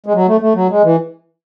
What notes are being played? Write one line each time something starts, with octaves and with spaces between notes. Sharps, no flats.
G#3
F#3
A3
A3
F#3
G#3
E3